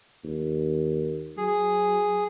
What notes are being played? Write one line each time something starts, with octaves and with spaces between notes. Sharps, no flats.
D#2
F#3 G#4